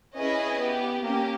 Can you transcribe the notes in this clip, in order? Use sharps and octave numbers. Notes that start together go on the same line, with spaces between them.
C#4 E4 G#4 B4 D#5
B3 G4
A#3 C#4 G4